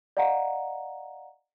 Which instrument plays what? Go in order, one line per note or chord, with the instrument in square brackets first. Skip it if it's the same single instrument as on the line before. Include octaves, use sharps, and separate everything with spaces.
[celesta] D5 D#5 F5 F#5 A#5